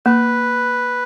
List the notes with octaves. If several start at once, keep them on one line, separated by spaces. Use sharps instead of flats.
A#3 B4